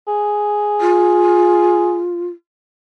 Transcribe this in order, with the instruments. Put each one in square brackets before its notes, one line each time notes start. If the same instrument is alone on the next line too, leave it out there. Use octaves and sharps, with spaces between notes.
[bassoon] G#4
[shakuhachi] F4